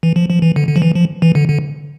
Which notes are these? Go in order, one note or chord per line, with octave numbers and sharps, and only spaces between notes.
E3
F3
F3
E3
D3
D3
F3
E3
F3
E3
D3
D3